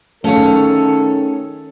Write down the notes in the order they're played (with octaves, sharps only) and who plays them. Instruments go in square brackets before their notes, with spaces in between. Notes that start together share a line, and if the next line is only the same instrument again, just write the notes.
[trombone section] D#3 A4 [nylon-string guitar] A3 F5 [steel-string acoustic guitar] C#4 G#4 C#5